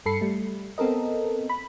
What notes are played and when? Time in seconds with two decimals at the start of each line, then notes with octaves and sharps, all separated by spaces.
0.06 G2 A4 B5 C7 C#7
0.21 G3 A3
0.78 B3 C4 A4 A#4 D#5
1.50 B5